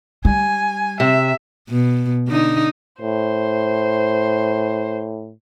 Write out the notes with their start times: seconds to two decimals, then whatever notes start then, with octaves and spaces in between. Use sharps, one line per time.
0.25 G3 G#5
1.00 C3 E5
1.69 B2
2.28 D3 D#4
3.01 A2 C5